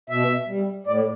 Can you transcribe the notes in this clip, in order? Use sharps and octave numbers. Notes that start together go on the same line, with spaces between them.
B2 E5
G3
A2 D5